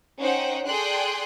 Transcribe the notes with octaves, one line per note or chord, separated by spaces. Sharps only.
C#4 D#4 C5 F#5 G5
G#4 A4 D5 G5 C6 F#6